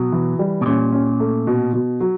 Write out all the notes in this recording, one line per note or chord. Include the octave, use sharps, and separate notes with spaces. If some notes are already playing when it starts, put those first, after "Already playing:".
Already playing: B2 F#3
E3
G3
B2
A#2 C#4
C#4
A3
B2
B2
F#3